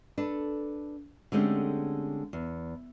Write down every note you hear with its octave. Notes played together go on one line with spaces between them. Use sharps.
D4 A4 B4
D3 G#3 A3 C4 C#4 G4
E2